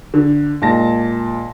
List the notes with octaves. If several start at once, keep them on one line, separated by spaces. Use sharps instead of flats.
D3
A#2 G#3 A5 A#6